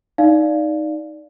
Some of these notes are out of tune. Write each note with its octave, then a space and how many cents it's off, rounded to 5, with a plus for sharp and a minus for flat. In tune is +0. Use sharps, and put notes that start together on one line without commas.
D#4 +0 D5 +0 F5 +0